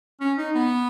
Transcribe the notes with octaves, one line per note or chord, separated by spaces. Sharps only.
C#4
D#4
B3